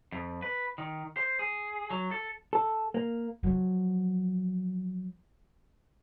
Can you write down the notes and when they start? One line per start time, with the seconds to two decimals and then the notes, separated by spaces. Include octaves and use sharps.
0.12 F2
0.42 B4
0.78 D#3
1.17 C5
1.39 G#4
1.90 F#3
2.11 A4
2.53 A4
2.94 A#3
3.43 F3 F#3